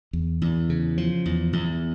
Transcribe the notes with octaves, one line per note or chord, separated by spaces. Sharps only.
E2
E2
C#3
F3
E2
E2